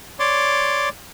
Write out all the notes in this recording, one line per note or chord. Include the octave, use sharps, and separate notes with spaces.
C#5 D5 C6 D6